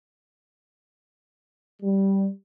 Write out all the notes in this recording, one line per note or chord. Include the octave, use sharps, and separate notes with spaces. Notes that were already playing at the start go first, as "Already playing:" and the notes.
G3